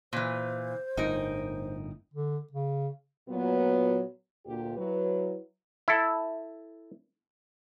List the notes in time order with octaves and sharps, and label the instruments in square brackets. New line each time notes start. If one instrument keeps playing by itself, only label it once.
[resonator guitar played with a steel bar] A#2 E3 [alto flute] C5
[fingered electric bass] G1 A2 [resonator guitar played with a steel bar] D#4 A#4
[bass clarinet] D3
C#3
[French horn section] A#2 F#3 B3
D2 A#2 G4
F#3 E4 B4
[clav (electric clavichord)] E4 A4